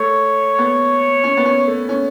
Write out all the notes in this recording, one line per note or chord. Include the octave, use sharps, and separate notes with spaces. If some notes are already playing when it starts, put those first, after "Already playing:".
Already playing: A3 C#5
B3
C#4
B3
C#4
A3
C#4